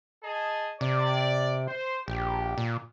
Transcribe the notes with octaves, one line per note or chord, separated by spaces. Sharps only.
G#4 D#5 A5
C3 D5
C5
A#1 G4
A#2